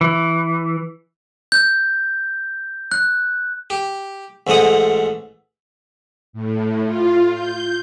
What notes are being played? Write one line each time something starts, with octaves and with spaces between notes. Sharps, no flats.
E3
G6
F#6
G4
A1 G#2 A3 F#5 D#6
A2
F4
G6